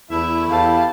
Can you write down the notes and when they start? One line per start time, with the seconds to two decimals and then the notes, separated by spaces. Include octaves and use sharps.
0.11 E2 A3 E4 E5
0.49 E2 G4 F5 A5